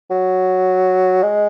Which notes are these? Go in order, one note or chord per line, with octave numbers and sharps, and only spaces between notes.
F#3
G#3